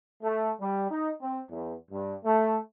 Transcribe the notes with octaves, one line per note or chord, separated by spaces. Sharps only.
A3
G3
D#4
C4
E2
G2
A3